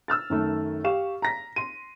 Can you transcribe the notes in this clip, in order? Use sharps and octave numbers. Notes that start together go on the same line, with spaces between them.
E6 F6 A6
F#2 D#3 A3
G4 F5 C#6 E7
A#5 A#6 B6
C6 D#7